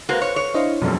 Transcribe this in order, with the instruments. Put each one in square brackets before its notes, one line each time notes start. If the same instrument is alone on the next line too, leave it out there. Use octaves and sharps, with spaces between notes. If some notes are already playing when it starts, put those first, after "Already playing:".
[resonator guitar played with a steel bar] G#3 A#3 F#4 [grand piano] B4 C5 F5
[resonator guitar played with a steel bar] C#5
C#5
[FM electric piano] D4 E4 C5 [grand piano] D#5 F5
[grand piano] E1 A#1 F#2 [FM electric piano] B2